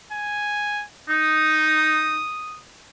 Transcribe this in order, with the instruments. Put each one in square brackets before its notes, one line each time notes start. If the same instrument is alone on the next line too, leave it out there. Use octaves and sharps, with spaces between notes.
[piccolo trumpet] G#5
[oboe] D#4 [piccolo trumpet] D#6